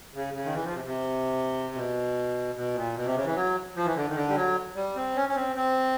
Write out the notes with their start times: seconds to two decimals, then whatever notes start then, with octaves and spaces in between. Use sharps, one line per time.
0.14 C#3
0.34 C#3
0.44 D#3
0.54 E3
0.64 F3
0.74 C3
0.84 C3
1.75 B2
2.55 B2
2.75 A#2
2.95 B2
3.05 C3
3.15 C#3
3.25 E3
3.35 F#3
3.76 F3
3.85 E3
3.96 D3
4.09 D#3
4.15 D3
4.29 G3
4.35 F#3
4.76 G3
4.96 C4
5.16 C#4
5.29 C#4
5.36 C4
5.56 C4